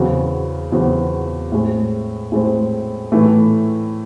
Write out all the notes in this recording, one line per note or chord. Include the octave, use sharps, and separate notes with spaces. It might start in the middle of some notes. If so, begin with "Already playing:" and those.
Already playing: E2 C#3 F#3 C4 F#4
E2 C#3 F#3 C4 F#4
A2 G#3 C4
A2 G#3 C4
A2 E3 A3